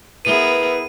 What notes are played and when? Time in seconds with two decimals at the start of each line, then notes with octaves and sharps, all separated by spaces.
0.25 B3 E4 G#4 A#4 B4 D#7